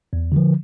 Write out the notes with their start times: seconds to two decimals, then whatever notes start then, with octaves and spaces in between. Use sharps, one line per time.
0.13 E2
0.32 D3 F3